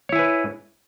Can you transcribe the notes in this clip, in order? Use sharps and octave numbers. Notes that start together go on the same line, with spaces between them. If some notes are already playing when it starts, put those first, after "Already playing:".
E4 B4 C#5 G#5